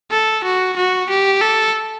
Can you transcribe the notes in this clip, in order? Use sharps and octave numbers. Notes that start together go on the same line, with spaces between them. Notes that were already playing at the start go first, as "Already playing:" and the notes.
A4
F#4
F#4
G4
A4